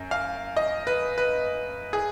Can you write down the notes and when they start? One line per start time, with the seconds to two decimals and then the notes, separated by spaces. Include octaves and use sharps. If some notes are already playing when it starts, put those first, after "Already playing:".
Already playing: F#2
0.11 F5
0.57 D#5
0.87 B4
1.18 B4
1.93 G#4